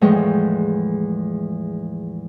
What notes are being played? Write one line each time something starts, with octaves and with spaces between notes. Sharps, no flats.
E2 A2 F3 G#3 G5 C#6